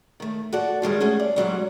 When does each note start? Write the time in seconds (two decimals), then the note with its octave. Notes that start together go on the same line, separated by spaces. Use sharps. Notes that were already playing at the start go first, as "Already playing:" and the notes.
0.20 D#3 A3
0.53 F#4 A4 D5
0.82 G2 D#3 G3 G#3
1.00 A3 C#4 F#4 G#4 A4
1.20 D5
1.36 G#2 B2 F#3 G3